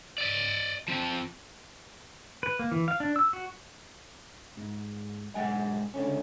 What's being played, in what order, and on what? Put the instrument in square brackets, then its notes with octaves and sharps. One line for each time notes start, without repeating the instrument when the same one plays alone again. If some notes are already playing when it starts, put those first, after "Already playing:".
[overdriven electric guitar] D5 D#5
F3 C4
[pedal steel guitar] B4
A#3
E3
F5
D4
E6
F#4
[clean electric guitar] G#2
B1 G#2 G#3 F#5 G#5
C#2 D3 C#4